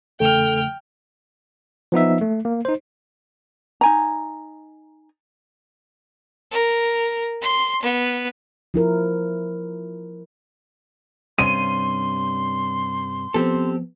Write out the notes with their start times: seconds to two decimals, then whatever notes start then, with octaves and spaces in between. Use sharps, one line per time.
0.20 E2 C#3 A3 A4 G5 F6
1.92 F3 B3 D#4 E5
2.21 A3
2.45 A#3
2.65 D#4 C5
3.81 D#4 G#5 A#5
6.51 A#4
7.42 C6
7.82 B3
8.74 F3 E4 A#4
11.39 G2 C3 C#4 C6 D#7
13.34 F3 B3 C4 G4 A4